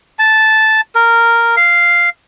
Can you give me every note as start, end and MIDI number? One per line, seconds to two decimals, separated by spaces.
0.19 0.81 81
0.95 1.56 70
1.57 2.09 77